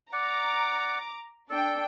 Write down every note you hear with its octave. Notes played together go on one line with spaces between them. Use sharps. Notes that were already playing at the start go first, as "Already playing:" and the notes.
D5 F#5 A#5 D6
D4 A4 D5 G5